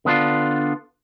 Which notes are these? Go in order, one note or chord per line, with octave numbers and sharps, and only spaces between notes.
D3 B3 D4 F4